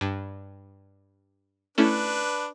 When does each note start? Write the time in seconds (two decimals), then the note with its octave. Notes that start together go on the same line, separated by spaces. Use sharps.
0.01 G2
1.78 A3 C#4 D4 E4 B4